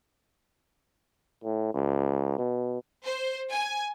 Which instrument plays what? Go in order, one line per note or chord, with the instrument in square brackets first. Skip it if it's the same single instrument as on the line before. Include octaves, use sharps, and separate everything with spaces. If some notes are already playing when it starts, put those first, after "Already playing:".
[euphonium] A2
C#2
B2
[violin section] C5
G#5